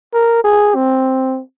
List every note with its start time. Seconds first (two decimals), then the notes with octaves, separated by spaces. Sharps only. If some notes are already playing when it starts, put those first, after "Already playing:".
0.14 A#4
0.44 G#4
0.75 C4